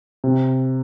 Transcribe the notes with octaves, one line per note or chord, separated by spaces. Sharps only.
C3